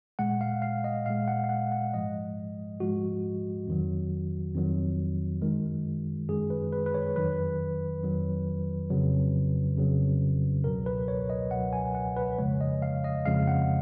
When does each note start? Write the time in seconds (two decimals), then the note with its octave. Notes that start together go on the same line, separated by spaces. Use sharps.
0.19 A#2 G#3 F#5
0.41 F5
0.62 F5
0.84 D#5
1.06 A#2 G#3 F5
1.28 F#5
1.44 F5
1.49 F#5
1.72 F#5
1.94 G#2 F3 G#3 D#5
2.80 G#2 F3 G#3 F#4
3.68 F2 D#3 F#3
4.55 F2 D#3 F#3
5.42 F#2 D#3 G#3
6.29 F#2 D#3 G#3 G#4
6.50 B4
6.72 B4
6.86 B4
6.94 C#5
7.16 F2 D#3 F#3 B4
8.03 F2 D#3 F#3
8.90 F2 C#3 F#3
9.77 F2 C#3 F#3
10.64 C#2 B2 F#3 A#4
10.86 B4
11.08 C#5
11.30 D#5
11.51 C#2 B2 F#3 F#5
11.73 G#5
11.95 F#5
12.16 B4
12.39 F2 C#3 F3 G#3 C#5
12.61 D#5
12.82 F5
13.04 D#5
13.26 F2 C#3 F3 G#3 F5
13.47 F#5